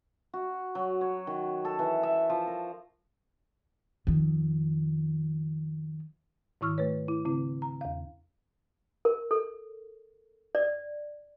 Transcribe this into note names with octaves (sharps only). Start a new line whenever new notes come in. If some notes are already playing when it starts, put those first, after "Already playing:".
F#4
F#3
C#5
D#3
A4
E3
E5
F3
A#4
F2 D#3
G#2 D#3 E4 C#6 E6 F6
A3 B4 C#5
E4
C#3 C4 E4
A#5
E2 F5
A#4
A4
D5